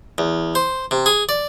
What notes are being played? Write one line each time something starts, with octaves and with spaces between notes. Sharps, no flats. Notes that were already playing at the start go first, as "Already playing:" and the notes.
E2
C5
C3
G#4
D5